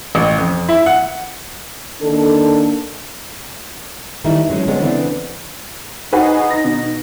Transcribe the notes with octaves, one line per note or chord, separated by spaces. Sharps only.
A1
F2
E4
F#5
D#3 A#3 D4 A4
D#3 E3 G3 A3 D#4 E4
F#3 G#3 C#4
D3 F3 F#3 G#3 B3 C#5
C#3 E3 A3 B3 C4 D4
D#4 F#4 G#4 B4
A#6
B2